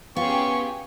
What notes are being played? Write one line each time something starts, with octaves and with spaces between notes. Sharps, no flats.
B3 C#4 F4 G4 G#4 C#6